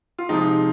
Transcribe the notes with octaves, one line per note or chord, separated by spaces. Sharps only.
F4
C3 F3 G#3 D#4